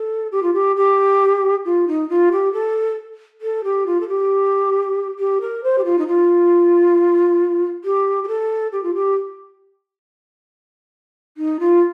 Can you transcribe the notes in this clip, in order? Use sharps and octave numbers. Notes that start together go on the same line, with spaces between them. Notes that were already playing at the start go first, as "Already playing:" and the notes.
Already playing: A4
G4
F4
G4
G4
F4
D#4
F4
G4
A4
A4
G4
F4
A4
G4
G4
A#4
C5
G4
F4
D#4
F4
G4
G4
A4
G4
F4
G4
D#4
F4